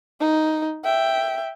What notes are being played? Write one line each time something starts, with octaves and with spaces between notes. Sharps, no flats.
D#4
E5 G5